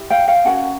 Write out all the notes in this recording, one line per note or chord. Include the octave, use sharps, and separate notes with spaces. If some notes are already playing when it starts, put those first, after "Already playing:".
Already playing: E4 G4
F5 G5
F5 G5
C#4 F#4 A#4 F#5 G#5